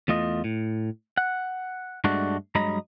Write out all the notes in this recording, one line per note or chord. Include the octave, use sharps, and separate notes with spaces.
E2 A3 F4 D#5
A2
F#5
G2 G#3 A3 D4 F#4
G2 F#3 G#3 D#5 A#5 B5